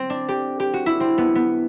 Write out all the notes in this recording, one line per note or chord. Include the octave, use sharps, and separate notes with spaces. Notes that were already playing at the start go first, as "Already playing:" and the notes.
Already playing: C4
D4
G4
G4
F#4
E4
C4
B3
B3